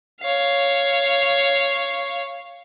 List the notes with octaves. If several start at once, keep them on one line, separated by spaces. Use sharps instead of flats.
C#5 F5